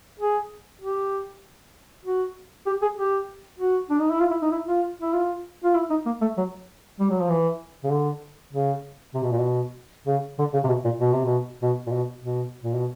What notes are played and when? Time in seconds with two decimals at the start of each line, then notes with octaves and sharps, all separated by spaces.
0.19 G#4
0.81 G4
2.05 F#4
2.66 G4
2.82 G#4
2.97 G4
3.59 F#4
3.90 D4
4.00 D#4
4.11 E4
4.20 F4
4.31 E4
4.42 D#4
4.51 E4
4.67 F4
5.02 E4
5.13 F4
5.64 F4
5.75 E4
5.90 D#4
6.06 A#3
6.21 A3
6.37 F#3
7.00 G3
7.10 F#3
7.20 F3
7.29 E3
7.84 C#3
7.91 D3
8.53 C#3
9.15 C3
9.23 B2
9.32 A#2
9.41 B2
10.07 C#3
10.39 D3
10.54 C#3
10.64 C3
10.68 B2
10.84 A#2
11.00 B2
11.13 C3
11.25 B2
11.62 B2
11.87 A#2
11.93 B2
12.23 B2
12.63 A#2
12.75 B2